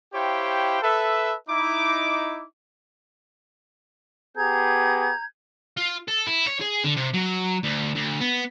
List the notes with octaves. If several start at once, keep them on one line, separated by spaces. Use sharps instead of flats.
E4 G4 C5 C#5 F5 G5
A4 B4 E5
D#4 E4 D6
B3 G4 G#4 A#5 G6 G#6
F4
A4
E4
C#5
G#4
D3
C3
F#3
D2
D2
B3